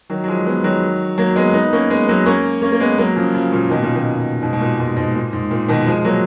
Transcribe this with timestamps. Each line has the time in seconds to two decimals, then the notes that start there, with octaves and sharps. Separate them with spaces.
0.10 D#3 F#3
0.24 F#3
0.28 F3 G#3
0.46 G#3 B3
0.64 D#3 F#3
1.18 F#3 A#3
1.36 G#3 B3
1.54 B3 D#4
1.73 A#3 C#4
1.90 G#3 B3
2.09 F#3 A#3
2.26 A#3 C#4
2.62 A#3 C#4
2.72 A#3
2.80 G#3 B3
2.98 F#3 A#3
3.16 C#3 F3
3.34 C#3 F3
3.52 A#2 C#3
3.70 B2 D#3
3.82 A#2 C#3
3.95 B2 D#3
4.42 G#2 B2
4.53 B2
4.61 A#2
4.78 G#2 B2
4.96 G#2 B2
5.15 A#2
5.33 G#2
5.51 A#2
5.68 B2 D#3
5.87 F3 G#3
6.04 F#3 A#3